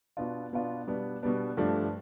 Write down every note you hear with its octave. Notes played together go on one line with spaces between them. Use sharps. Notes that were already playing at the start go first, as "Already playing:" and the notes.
B2 B3 D4 F4
B2 B3 D4 F4
B2 G3 B3 D4
B2 G3 B3 D4
G2 F3 A3 D4 G4